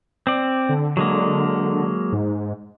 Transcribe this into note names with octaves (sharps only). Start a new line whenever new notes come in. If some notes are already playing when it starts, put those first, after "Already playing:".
C4 D5
D3
F#3 G#3 A#3
G#2